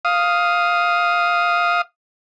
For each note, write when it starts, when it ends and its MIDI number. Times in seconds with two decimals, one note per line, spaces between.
0.05 1.81 77
0.05 1.81 87